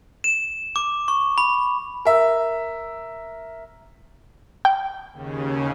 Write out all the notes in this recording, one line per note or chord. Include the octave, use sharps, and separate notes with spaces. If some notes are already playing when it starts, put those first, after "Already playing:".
E7
D6
C#6
B5
A#4 E5
G5
D#2 C#3